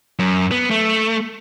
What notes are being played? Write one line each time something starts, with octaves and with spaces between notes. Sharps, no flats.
F#2
B3
A3